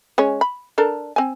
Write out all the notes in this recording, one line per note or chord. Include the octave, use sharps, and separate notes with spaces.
G#3 C#4 C#5
B5
D4 A4 A#4
C4 G#5